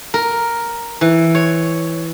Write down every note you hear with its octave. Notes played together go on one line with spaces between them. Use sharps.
A#4
E3
C#5